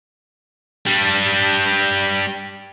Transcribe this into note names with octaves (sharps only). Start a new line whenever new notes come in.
G3 D4